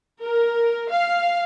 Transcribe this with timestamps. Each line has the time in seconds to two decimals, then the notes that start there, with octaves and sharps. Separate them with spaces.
0.22 A#4
0.91 F5